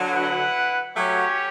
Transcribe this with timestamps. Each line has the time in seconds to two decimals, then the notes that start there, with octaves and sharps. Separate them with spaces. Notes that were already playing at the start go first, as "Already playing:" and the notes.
Already playing: D3 F#3
0.12 E4 B4 F#5
0.96 F#3 A3 C#4 G4 C#5